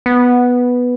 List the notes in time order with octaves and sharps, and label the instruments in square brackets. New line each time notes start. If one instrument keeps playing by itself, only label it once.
[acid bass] B3